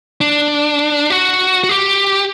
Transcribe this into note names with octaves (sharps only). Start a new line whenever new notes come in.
D4
F#4
F#4
G4